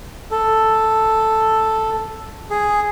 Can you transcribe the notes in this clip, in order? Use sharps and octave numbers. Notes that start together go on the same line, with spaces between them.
A4
G#4